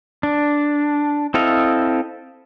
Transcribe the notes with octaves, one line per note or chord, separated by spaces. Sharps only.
D4
C4 E4 A4 D#5 F5